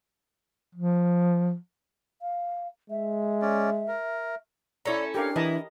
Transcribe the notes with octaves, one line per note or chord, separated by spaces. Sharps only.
F3
F5
G#3 E5
C#4 D5
A#4
C#4 E4 A4 C#5 D5 A#5
D4 G4 A#4 F5
E3 E4 D#5 A5 A#5